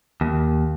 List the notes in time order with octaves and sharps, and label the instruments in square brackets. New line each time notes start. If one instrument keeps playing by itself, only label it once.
[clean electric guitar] D#2